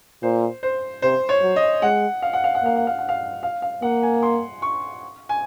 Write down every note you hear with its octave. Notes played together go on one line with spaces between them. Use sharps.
A#2 C5
C5
C3 C5
C#5
F#3
D#5
G#3 F#5
F5
F#5
F5
F#5
A#3 F5
F#5
F5
F#5
F5
F5
F5
A#3 F#5
G#5
C6
C#6
G#5